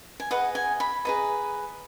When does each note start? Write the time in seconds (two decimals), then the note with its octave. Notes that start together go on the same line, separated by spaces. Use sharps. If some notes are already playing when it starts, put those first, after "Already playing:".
0.20 G#5
0.31 G#4 B4 D#5 F#5
0.55 G#5
0.80 B5
1.05 G#4 B4 D#5 A#5